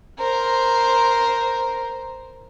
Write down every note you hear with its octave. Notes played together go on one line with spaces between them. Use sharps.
A#4 C5